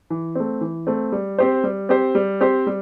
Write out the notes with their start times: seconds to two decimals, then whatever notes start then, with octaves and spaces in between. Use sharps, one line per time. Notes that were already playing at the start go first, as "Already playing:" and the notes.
0.10 E3
0.35 A3 C4
0.61 E3
0.87 A3 C4
1.12 G3
1.38 C4 G4 C5
1.64 G3
1.89 C4 G4 C5
2.15 G3
2.41 C4 G4 C5
2.67 G3